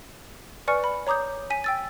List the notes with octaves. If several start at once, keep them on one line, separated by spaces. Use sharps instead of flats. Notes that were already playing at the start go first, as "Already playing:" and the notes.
B4 D5 G#5 C#6 F6 C#7
B5
C#5 A#5 D6 D#6 G6
G#5 B6 D#7
G5 E6 A6